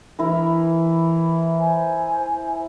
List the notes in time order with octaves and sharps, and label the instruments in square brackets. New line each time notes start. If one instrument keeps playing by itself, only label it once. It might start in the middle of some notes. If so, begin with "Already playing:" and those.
[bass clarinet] E3 [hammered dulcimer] E4 A#4
[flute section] C5 G#5